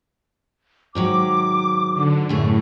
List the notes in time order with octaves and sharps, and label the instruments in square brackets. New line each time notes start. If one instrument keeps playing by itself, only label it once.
[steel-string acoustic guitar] G#2 D#3 F#3 [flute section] D6
[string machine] D3
[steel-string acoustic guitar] F#2 A3 G#4 [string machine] A2